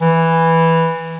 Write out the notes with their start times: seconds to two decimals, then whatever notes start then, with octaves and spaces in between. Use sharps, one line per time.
0.01 E3